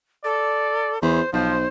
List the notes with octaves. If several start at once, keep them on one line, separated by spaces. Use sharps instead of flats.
A4 D5
E2 C5
B1 F3 C5